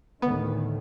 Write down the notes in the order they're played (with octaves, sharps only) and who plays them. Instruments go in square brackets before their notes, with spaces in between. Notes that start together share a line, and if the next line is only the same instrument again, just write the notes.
[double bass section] D2 A2 D#3 [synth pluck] B3